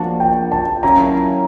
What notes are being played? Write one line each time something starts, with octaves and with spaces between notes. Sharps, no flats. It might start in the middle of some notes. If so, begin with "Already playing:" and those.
Already playing: F3 A#3 D4 F#4 A5
G5
A5
F#3 A#3 C#4 E4 A#5